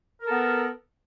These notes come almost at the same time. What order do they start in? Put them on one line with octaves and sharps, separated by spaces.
A#4 A4 B3